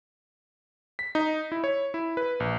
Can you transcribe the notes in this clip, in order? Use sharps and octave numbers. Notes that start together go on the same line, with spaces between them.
B6
D#4
E4
C#5
E4
B4
A#1